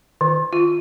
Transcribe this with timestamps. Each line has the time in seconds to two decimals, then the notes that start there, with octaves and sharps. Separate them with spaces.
0.21 D#3
0.53 F4